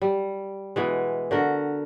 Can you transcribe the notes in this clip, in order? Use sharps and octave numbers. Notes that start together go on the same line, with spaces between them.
G3
B2 E3 G#3
D3 F#4 A#4